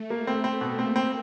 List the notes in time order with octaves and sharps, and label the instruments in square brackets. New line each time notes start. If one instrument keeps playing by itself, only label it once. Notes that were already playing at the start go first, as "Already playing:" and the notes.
Already playing: [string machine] A3
[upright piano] A#3
C4
C4
B2
[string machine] A#3 [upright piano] C4
[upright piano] C4